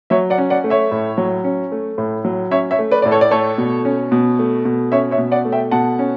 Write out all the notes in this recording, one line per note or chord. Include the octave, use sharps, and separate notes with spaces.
F#3 C#5 E5
D5 F#5
C#4
D5 F#5
A3
C#5 E5
A2
F#3
C#4
A3
A2
F#3
C#4 C#5 E5
C#5 E5
A3
B4 D5
A2 D5
A4 C#5
D5
A3 A4 C#5
B2
C#4
B2
A3
B2
C#4 C#5 E5
C#5 E5
B2
D5 F#5
A3
E5 G5
B2 F#5 A5
C#4